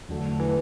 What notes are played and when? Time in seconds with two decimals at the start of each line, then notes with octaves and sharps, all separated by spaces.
0.09 E2 D3 F#3 A3
0.40 E3